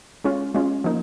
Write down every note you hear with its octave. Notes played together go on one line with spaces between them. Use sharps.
G#3 C#4 F4
G#3 C#4 F4
F3 A#3 D#4